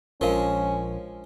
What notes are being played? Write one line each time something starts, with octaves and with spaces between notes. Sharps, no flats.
A#1 F3 G#3 C#4 A#4 F5